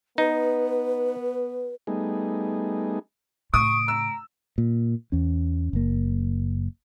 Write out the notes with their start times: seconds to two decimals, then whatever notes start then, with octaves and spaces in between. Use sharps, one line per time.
0.18 B3 D#4 B4
1.87 G3 A3 B3 D#4 G#4
3.54 A2 C#3 C#6 D#6 D7
3.88 A#5 E6
4.58 A#2
5.12 E2 C#4
5.73 F#1 A#3